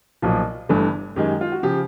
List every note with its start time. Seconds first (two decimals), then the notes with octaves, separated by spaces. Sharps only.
0.22 B1 A#2 F3
0.69 G1 G2 E3 A3
1.16 F#2 D#3 G#3 G4
1.41 F4
1.52 F#4
1.63 C#3 F3 G4